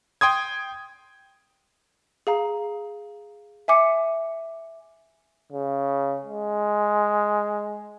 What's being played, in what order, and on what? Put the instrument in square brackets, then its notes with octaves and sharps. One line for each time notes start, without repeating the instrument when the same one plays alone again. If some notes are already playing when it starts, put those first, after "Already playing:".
[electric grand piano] G5 C6 D#6 G#6
[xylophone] G#4 F5 A#5
E5 G#5 D6 C#7
[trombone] C#3
G#3